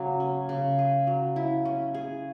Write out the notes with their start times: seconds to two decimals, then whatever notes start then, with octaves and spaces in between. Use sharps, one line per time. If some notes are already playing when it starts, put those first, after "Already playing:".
Already playing: C#3 F#3 A#3
0.20 C#4
0.49 C#3
0.79 G#4
1.07 F#3
1.36 E4
1.65 C#4
1.94 G#4